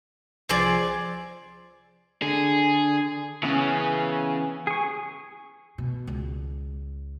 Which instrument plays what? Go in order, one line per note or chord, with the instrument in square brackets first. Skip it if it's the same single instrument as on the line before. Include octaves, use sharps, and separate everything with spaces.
[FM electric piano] C2 F3 A6 [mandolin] C4 G#4 D5
[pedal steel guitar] D3 [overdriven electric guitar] G#4
[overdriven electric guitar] C#3 [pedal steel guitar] E3 B3 C#4
[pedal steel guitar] G#4 C#6
[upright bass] B2
C#2